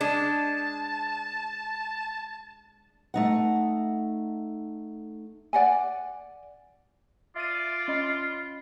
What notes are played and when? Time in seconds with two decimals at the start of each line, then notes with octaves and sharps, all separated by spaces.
0.01 G#3 D4 A5
3.14 A3 D#4 F#5
5.53 D5 F#5 G#5
7.36 F4 D5 E5 D#7
7.88 C#4 D#5 B5